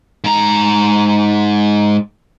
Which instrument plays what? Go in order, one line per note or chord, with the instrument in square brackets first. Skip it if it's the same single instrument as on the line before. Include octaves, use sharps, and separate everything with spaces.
[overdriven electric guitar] G#2 A#5